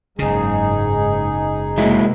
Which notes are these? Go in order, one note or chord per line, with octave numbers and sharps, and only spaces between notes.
F#1 G#2 C#3 D#4 G#4
C3 F#3 G#3 A#3 E4